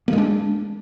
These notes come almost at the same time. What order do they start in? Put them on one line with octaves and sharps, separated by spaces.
A#3 G#3 D4